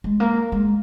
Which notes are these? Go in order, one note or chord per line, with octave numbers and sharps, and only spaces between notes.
G#3
A#3
G#3